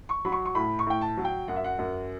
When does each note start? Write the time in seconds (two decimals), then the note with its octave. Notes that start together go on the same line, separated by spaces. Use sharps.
0.09 C#6
0.25 F#3 B5
0.32 C#6
0.45 C#6
0.55 A2 B5
0.79 C#6
0.87 A2 G5
1.01 A5
1.17 F#3
1.25 G5
1.48 F#2 F#5
1.56 E5
1.64 F#5
1.79 F#2